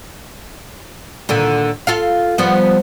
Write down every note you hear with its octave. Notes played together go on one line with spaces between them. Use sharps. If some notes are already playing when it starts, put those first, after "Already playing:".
A#2 D3 D#3
F4 A4 F5
F3 G3 B3